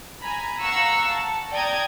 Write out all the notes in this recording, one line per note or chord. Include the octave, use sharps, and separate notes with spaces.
G#5 A#5 B5
F5 F#5 A#5 C#6 E6 F#6
A5
D5 G5 A#5 D#6 G#6